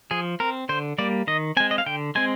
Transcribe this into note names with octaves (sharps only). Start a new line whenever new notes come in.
F3 G#4
C4 A#4
D3 C5
G3 A#3 D5
D#3 D#5
G#3 C4 G#5
D#5
F5
D3 G5
G#3 C4 G#5